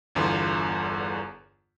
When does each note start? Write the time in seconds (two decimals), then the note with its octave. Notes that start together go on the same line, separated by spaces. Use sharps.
0.15 G1 E2 D3 F4 B4 C6